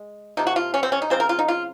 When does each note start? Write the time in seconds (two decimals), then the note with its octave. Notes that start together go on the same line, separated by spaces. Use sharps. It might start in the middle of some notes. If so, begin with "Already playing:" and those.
Already playing: G#3
0.37 C3 F3 A#3 D#4
0.47 F#4
0.56 F4
0.74 C#4
0.83 C4
0.92 C#4
1.02 D#4
1.10 C#3 F#3 C4 C5
1.20 A#4
1.29 F4
1.39 D#4
1.48 F4